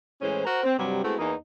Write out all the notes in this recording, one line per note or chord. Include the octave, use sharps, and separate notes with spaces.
A2 E3 G#3 C#4 C5
F#4 A#4 C5
C4
G2 C3 F#3 G3
G#3 A3 B3 C4 E4 F#4
E2 E3 A#3 D#4